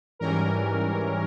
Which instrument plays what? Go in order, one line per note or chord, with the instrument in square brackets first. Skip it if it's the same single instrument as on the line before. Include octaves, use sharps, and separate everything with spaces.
[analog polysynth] G#2 E3 G3 C#4 A#4